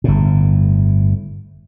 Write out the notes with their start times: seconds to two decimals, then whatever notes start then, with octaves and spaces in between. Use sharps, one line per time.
0.04 G1 A2